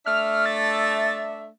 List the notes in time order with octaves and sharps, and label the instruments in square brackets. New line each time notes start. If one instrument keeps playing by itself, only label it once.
[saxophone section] A3 D4 E5 [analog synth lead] F6
[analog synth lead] A6